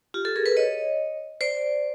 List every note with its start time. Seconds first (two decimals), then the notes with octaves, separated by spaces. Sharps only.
0.14 F4 G4
0.25 G4 A4
0.36 G#4 A#4
0.46 A4 B4
0.57 C#5 D#5
1.41 C5 D5